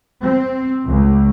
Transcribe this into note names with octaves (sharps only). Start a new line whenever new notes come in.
C4
C#2